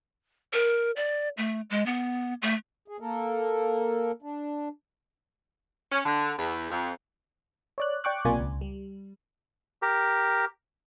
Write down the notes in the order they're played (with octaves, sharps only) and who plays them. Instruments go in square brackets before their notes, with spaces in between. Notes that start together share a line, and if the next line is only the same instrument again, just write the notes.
[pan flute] A#4
D5
A3
G#3
B3
A3
[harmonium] G#4
A#3 A4 A#4
D4
[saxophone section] C#4
D3
E2
F2
[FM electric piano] C#5 D5 F#6
D5 G5 C#6 D6 F#6
B1 C3 A#3 F4 D5 G#5
C#2
G3
[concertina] G4 A#4